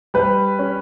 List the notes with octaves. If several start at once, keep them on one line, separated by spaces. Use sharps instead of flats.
G3 B4
C#4